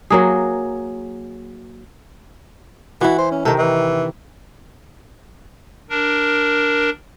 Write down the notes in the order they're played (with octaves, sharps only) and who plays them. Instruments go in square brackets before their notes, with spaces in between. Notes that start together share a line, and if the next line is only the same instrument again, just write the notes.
[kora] F#3 A#3 G#4
[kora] E3 E4 [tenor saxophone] F#4
[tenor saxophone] C5
C#4
[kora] C3 D#3 [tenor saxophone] A4
[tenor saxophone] E3
[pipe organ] D4 A#4